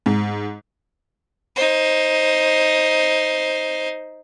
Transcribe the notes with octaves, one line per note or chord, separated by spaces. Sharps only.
G#2
D#4 C5